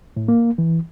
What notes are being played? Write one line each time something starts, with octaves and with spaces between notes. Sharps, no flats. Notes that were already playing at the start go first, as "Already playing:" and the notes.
A2
A#3
E3